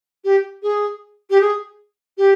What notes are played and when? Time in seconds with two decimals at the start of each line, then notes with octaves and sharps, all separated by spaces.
0.24 G4
0.63 G#4
1.30 G4
1.41 G#4
2.18 G4